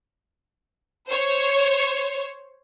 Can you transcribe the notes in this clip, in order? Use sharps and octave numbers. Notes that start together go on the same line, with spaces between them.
C5 C#5